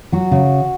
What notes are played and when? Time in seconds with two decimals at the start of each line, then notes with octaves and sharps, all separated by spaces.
0.12 F#3 F#4
0.31 C#3